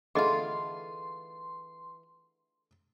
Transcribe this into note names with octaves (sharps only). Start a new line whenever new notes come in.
D3 E3 A3 F4 G#4 D#5 C6